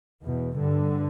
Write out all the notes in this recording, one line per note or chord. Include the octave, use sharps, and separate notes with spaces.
E2 B2
G2 D3